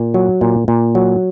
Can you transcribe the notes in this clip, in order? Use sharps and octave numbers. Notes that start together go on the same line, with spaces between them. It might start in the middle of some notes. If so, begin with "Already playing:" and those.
Already playing: A#2
F#3
A#2
A#2
F#3